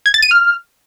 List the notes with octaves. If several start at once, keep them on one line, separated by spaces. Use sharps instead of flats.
G#6
A6
D#7
F6